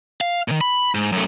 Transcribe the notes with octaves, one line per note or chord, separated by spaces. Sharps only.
F5
A#2 D#3
B5
G#2
F#2 A3